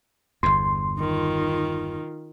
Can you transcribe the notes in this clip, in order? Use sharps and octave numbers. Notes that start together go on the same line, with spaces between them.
G1 E2 C6
D#3 F4